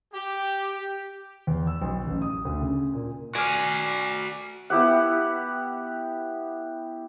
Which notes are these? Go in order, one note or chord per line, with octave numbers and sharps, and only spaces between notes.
G4
E2
E6
B1
A1
D#6
D2
C#3
A#2
F#4 D5 G#5 F6
B3 E4 G4 F#5